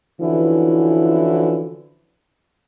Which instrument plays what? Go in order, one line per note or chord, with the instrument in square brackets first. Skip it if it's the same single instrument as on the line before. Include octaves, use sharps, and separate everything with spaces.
[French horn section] D3 E3 F3 C#4 E4 F#4